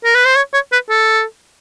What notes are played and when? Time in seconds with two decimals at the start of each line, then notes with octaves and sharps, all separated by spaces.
0.04 A#4
0.15 B4
0.25 C5
0.36 C#5
0.54 C#5
0.72 B4
0.90 A4